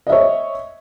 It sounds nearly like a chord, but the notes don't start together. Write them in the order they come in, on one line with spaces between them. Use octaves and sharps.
D#5 E5 C#5